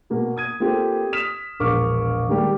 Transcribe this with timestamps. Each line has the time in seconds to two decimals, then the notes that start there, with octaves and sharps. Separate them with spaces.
0.10 B2 A#3 F#4
0.37 D#6 G#6 D#7
0.60 A#3 C4 F4 G4 A4
1.12 D#6 F6 B6 E7
1.60 E1 A#1 A#4 C#6 D6 F6
2.28 D#3 G3 G#3 A#3 G4